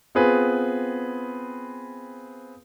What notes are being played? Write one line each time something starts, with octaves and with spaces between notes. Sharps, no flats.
B3 C4 F4 G#4 B4